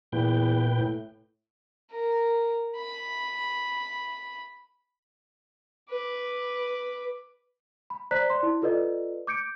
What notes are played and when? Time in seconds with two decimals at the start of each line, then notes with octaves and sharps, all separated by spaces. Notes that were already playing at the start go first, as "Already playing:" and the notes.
0.13 E2 A#2 B4 G5
0.77 A2
1.91 A#4
2.77 B5
5.90 B4 D6
7.90 B5
8.11 C5 D5 A#5 F#6 B6
8.30 D5 C6
8.43 E4
8.62 F4 A4 B4 D5 D#5
9.27 D6 G6 C#7 D7